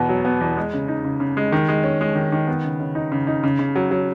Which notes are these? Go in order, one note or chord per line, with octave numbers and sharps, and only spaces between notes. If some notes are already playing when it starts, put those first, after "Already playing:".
Already playing: E2 B2 B3
F#3
B3
E2
G#3
C#3
D#4
C#3
C#3
G#3
D#3
G#3
C#4
G#3
D#3
D#3
B3
C#3
C#3
D#4
C#3
D#4
C#3
C#3
F#3
F#3